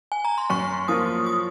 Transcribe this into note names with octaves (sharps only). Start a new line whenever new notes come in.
G#5
A#5
C6
F#2 C#6
F3 A#3 F4 D#6
D#6